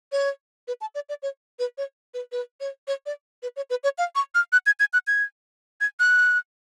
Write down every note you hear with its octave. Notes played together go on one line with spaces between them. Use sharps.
C#5
B4
A5
D5
D5
C#5
B4
C#5
B4
B4
C#5
C#5
D5
B4
C#5
B4
C#5
F5
C#6
F6
F#6
G#6
G#6
F#6
G#6
G#6
F#6